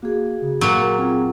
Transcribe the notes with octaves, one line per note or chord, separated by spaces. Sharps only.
A#3 F#4 G#4
C#3
A#2 F#3 A#3
A#4
C4 F4 G#4